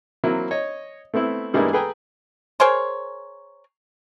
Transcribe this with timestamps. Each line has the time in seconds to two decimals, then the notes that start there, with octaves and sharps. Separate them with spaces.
0.24 F#3 A#3 C4 E4
0.51 C#5 D#5
1.14 A3 B3 C4 E4
1.53 G2 G3 G#3 A#3 B3 E4
1.73 G#4 A4 B4 G5 G#5 A#5
2.60 G#4 A#4 C5 C#5